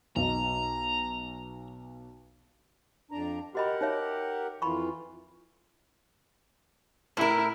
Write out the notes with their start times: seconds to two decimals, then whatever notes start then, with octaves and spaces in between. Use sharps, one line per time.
0.16 B1 D#4 A#5
3.11 F2 D4 A#5
3.55 F#4 G4 A#4 D#5 F#5 B5
3.81 D#4 C#5 E5
4.62 F2 E3 F4 B5 C#6
7.17 A2 E4 A#4